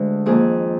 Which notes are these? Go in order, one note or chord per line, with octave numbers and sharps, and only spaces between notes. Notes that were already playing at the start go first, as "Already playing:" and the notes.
Already playing: D2 D3 G#3
F2 D#3 A#3 G#4